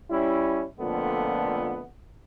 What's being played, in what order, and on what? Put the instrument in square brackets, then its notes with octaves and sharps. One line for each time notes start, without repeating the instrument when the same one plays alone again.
[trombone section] G3 C#4 E4
F2 A#2 D3 A3 B3